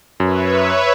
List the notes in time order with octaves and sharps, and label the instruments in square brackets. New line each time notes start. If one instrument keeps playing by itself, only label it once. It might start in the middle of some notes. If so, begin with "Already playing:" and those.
[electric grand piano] F#2 [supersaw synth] B4 C#5 E5